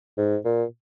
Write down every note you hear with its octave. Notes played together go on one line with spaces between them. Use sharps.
G#2
A#2